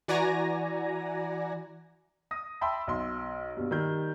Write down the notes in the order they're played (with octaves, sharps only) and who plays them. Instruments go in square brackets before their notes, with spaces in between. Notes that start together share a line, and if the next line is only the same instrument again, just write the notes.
[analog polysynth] E3 F#4 D5 G#5 A#5 A#6
[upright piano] D#6 A#6
E5 G5 A5 B5 C6 E6
B1 C6
G2 B2
D#3 G3 G6